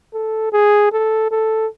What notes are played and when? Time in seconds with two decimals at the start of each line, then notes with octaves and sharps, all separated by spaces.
0.14 A4
0.53 G#4
0.92 A4
1.31 A4